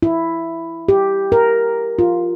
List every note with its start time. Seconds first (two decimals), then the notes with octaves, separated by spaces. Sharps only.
0.03 E4
0.89 G4
1.32 A#4
1.99 F4